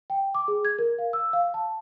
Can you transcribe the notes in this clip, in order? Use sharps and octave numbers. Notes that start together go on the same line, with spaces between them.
G5
D6
G#4
G#6
A#4
F5
E6
F5
A5